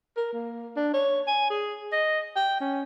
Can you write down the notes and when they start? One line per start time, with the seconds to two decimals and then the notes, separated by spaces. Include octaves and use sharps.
0.17 A#4
0.33 A#3
0.76 D4
0.93 C#5
1.27 G#5
1.50 G#4
1.92 D#5
2.36 G5
2.60 C#4